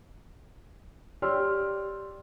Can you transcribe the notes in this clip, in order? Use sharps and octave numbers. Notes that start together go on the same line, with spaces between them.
G4 C#5 D5 C6 E6 F6